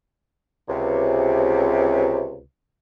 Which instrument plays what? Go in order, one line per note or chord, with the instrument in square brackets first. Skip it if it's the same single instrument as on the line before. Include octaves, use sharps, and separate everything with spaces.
[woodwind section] C#2 C3